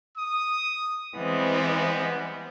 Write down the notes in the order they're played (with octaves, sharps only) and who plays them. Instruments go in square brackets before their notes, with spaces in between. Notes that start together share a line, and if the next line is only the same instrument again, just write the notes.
[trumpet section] D#6
[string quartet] E3 G#3 C4 [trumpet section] G3 B3